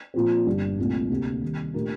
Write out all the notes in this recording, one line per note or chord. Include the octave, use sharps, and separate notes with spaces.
A#2 F3 C4
G1 G2 D3 G3 D4
C2 A#2 A3
D2 C3 G3 A#3
C3 D#3 G3
A#2 A3 D4 G4 A#4